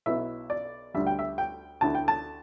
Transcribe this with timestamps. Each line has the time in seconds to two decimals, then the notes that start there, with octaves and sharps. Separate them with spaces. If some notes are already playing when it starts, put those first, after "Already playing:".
0.06 B1 B2 B3 E4 E5
0.50 D5
0.94 D2 D3 G3 E5
1.07 G5
1.19 E5
1.38 G5
1.81 D2 D3 A3 E4 A5
1.95 G5
2.08 A5